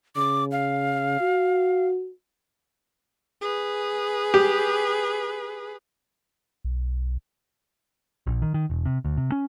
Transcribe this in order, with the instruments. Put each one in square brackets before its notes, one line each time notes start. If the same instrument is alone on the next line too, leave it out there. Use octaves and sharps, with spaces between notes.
[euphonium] C#3 [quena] D6
[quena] F5
[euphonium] F#4
[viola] G#4 B4
[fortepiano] G4
[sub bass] B1
[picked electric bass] A#1
D#3
D#3
E1
C3
D2
C3
C#4